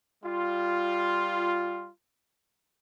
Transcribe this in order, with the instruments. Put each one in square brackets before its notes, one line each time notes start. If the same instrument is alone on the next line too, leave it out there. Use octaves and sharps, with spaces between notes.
[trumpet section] G3 F4